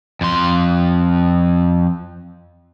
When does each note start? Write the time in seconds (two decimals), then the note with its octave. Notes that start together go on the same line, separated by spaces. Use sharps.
0.21 F2 C6